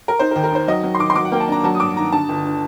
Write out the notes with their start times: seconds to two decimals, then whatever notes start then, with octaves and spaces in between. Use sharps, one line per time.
0.08 A#4
0.19 D#4 C5
0.31 A#4
0.36 D#2
0.44 A#4
0.52 D#3 C5
0.68 F#3 D#5
0.83 F#3
0.95 C6
0.99 D#3 D6
1.10 C6
1.15 F#3 D6
1.25 F#5
1.32 A#3 G5
1.40 A5
1.48 D4 A#5
1.64 F#3 A5
1.75 D#6
1.80 G2 D6
1.96 D#3 A#5
2.12 D3 A5
2.29 G1
2.45 D3